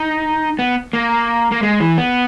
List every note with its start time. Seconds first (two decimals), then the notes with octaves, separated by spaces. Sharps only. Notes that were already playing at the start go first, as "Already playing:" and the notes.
Already playing: D#4
0.59 B3
0.93 A#3
1.52 A#3
1.63 G#3
1.80 E3
1.98 B3